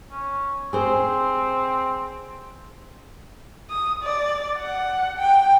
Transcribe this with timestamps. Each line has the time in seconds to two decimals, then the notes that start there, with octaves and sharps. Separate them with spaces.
0.11 C#4
0.73 C4 G#4 C5
3.70 D#6
4.03 D5
4.57 F#5
5.18 G5